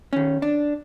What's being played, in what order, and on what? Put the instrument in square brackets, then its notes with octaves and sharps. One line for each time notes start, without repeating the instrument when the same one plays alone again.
[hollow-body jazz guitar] D#3 C#4
D4